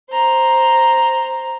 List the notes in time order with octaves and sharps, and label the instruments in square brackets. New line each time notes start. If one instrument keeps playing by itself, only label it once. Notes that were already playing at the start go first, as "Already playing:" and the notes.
[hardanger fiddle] C5 A#5